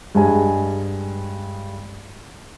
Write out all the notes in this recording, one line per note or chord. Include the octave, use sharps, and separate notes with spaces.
G2 G#3 G#5